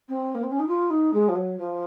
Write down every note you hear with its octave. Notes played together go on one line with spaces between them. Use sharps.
C4
A#3
C4
C#4
D#4
F4
D#4
G#3
F3
F#3
F3